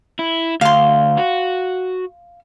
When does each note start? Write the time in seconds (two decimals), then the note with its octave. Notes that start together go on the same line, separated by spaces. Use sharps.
0.19 E4
0.61 D2 F5 C6
1.17 F#4